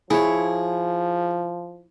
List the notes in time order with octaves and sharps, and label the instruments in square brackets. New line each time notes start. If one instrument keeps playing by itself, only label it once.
[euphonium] F3 [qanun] E4 C#5 [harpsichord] G#4